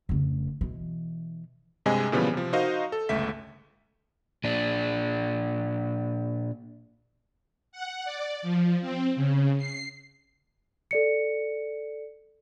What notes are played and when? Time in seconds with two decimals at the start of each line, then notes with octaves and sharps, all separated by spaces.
0.09 F1 C#3
0.61 B2 E3
1.86 G2 C3 G#3 D#5 G#5
2.12 A#2 C#3 E3 F3 G3 B3
2.33 C3 F3
2.53 D#4 F#4 A#4 C5 D#5 F5
2.92 A4
3.09 G1 C#2 A3 E5 B6
4.44 A#2 D4
7.72 F#5
8.05 D5
8.42 F3
8.81 C4
9.16 C#3
9.58 C7
10.91 A4 D5 C#7